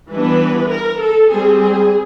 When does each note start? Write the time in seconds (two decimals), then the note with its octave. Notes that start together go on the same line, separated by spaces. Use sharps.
0.11 E3 G3 B3 D4 B4
0.70 A#4
1.00 A4
1.29 G3 C4 G#4
1.59 G#4